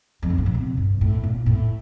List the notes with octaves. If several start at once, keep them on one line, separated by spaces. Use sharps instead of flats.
F2
G2
A2
A#2
C3
G2
A2
A#2
A2